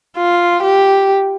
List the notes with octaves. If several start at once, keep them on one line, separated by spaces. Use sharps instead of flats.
F4
G4